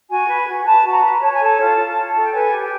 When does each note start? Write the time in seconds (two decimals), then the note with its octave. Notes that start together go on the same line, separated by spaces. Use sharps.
0.08 F#4 G#5
0.27 B4
0.46 F#4
0.60 G#5
0.64 B4 A5
0.83 F#4
0.92 A#5
1.02 B4
1.20 C#5 A5
1.31 G#5
1.39 A4 A5
1.58 F4
1.77 F4
1.96 C#5
2.14 A4
2.21 G5
2.33 B4 G#5
2.52 G4
2.61 G5